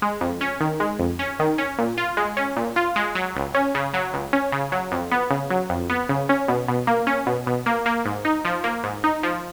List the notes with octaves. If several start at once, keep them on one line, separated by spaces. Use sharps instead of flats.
G#3
F2
C#4
D#3
G#3
F2
C#4
D#3
C#4
A#2
F4
G#3
C#4
A#2
F4
G#3
F#3
C#2
C#4
C#3
F#3
C#2
C#4
C#3
F#3
F2
B3
C#3
F#3
F2
B3
C#3
C#4
B2
B2
A#3
C#4
B2
B2
A#3
A#3
G#2
D#4
F3
A#3
G#2
D#4
F3